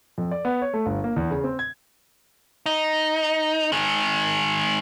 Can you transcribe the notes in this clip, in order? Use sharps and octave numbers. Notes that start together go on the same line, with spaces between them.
F2
D5
B3
C#5
A3
G1
A#3
E2
C#3
C4
G#6
D#4
D#3 G#3